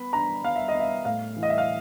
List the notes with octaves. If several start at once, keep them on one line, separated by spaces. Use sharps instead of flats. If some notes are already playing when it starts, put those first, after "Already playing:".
Already playing: B3 B5
D4 A#5
B3 F5
E5
D#5
B3
E5
A2 F5
E3
D#5
E5
F5